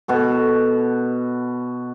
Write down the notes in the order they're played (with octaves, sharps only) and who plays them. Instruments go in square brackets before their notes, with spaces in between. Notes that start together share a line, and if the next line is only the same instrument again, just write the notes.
[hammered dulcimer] B2 F#4 A4